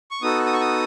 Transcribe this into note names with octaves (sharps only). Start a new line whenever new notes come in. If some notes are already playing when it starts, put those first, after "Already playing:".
C#6
B3 D#4 F#4 A4 D#6
D#6
C#6
D#6